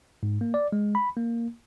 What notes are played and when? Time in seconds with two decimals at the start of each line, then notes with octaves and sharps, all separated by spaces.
0.23 G#2
0.41 A#3
0.54 D5
0.72 G#3
0.95 B5
1.17 A#3